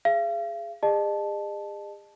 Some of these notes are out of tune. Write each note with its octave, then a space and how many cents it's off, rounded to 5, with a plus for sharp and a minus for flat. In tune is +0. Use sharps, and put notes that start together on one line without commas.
G#4 +0 F5 -40
G#4 -40 D#5 -40 A5 -10